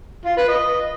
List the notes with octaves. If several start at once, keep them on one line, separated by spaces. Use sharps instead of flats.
F4
B4
D#5